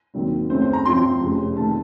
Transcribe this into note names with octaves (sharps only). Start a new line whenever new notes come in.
D#2 D#3 F#3 C4
F#2 C#3 A3 C4 C5
C5
A#5
F#2 F3 C4 C6
F1 F2 C#3
F2 D#3 A3 C4 A5